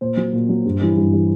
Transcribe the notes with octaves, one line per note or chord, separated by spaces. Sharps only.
A#2 C5
F#3
A#2
F#3
G2
E3 G3
G2
E3 G3